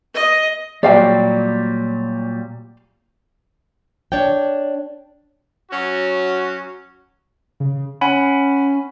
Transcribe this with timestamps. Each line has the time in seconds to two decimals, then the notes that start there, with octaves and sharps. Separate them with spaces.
0.14 D#5
0.83 A#2 F#3 G3 D5 F5 G5
4.12 D4 C#5 D5 G5
5.71 F#3 C#4 F#4
7.60 C#3
8.01 C#4 F#5 G#5 B5